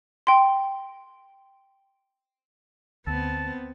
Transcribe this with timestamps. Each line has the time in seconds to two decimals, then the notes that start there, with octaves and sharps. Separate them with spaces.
0.27 G5 C6
3.07 D2 B3 C4 A5